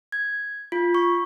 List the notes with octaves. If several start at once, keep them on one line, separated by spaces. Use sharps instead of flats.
G#6
F4
C#6